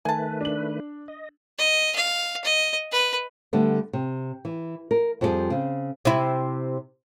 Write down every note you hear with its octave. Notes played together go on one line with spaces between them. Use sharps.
D#3 A3 B4 G#5 A5
D4 F#7
D#5
D#5
F5
D#5
B4
D3 G3 A3 B3
C3
E3
A#4
F2 F3 G3 E4 G4 G#4
C#3 C4
C3 E4